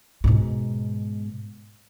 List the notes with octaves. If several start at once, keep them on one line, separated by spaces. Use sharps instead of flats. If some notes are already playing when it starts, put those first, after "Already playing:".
G#2 B2